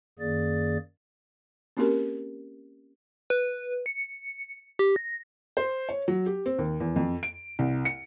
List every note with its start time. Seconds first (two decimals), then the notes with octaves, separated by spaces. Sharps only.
0.19 F#2 D#3 A#3 G#4 D5 A6
1.77 A#3 C4 C#4 F#4 G4 A#4
3.30 B4
3.86 C#7
4.79 G4
4.96 A#6
5.57 C5
5.89 C#5
6.08 F#3
6.26 G4
6.46 C4
6.59 D#2
6.80 E2
6.96 F2
7.23 D7
7.59 C2
7.85 C#7